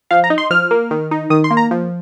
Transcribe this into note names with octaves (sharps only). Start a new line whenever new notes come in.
F3 F5
A#5
D#4
C6
F3 F6
A#3
D#3
D#4
D#3 D#6
C6
A#3
A#5
F3